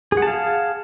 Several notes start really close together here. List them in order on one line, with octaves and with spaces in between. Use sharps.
G#4 F#5 A5 F5